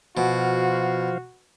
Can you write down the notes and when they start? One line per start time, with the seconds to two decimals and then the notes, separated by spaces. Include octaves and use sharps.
0.17 B2 F3 F#4 C5 F5